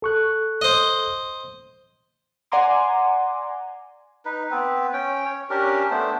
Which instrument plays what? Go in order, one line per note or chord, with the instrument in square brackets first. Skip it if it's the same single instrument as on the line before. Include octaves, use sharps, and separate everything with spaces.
[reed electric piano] A4 C#6 F#6
[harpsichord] C5 D#5
[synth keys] D5 F#5 G#5 A#5 C6 D6
[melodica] D#4 B4
B3 C4 B4
C#4 G5
C#5
C#4 D4 G4 A#4
A3 B3 D4 C5